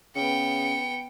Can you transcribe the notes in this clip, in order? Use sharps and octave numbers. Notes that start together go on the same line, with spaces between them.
C#3 B3 G5 C#7